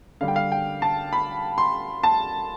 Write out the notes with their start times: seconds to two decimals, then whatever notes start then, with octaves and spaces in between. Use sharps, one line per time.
0.21 D3 G3 F5
0.28 G5
0.36 F5
0.52 G5
0.82 A5
1.13 B5
1.58 C6
2.03 A5